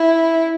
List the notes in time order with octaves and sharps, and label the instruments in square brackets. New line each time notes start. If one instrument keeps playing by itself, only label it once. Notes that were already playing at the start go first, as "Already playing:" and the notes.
Already playing: [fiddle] E4